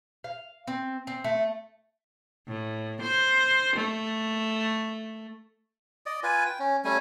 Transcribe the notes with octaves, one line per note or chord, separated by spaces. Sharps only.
F5
C4
C4
A3
A2
C5
A3
D5 D#5
F4 B4 G#5
G5
C#4
G3 A3 C#4 G#5